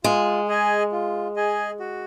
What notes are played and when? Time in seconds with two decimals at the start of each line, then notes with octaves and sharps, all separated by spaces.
0.04 G#3 F4
0.48 G#4 D#5 G#5
0.92 F4
1.36 G#4 D#5 G#5
1.80 F#4